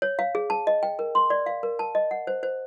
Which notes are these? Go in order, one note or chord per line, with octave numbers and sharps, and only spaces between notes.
C#5
F5
G#4
A5
D#5
G5
A#4
C6
D5
F5
A#4
A5
D#5
F#5
C5
C5